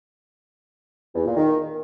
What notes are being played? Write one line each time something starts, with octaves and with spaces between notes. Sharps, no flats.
E2
A#2
D#3